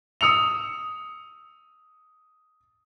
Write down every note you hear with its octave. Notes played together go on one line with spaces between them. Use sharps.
D#6 E6 C#7 F7